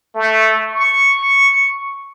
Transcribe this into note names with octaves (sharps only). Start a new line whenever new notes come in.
A3
C#6